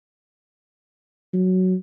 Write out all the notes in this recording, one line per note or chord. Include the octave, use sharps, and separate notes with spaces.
F#3